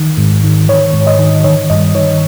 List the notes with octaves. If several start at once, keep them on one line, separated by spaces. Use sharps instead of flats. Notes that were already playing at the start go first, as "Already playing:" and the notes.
Already playing: D#3
G#2
D#3
D#3 C#5
G#2
D#5
D#3
D#3 C#5
G2 D#5
D#3 C#5